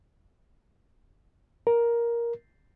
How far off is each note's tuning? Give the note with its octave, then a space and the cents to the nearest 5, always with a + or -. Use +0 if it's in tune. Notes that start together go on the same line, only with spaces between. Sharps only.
A#4 +10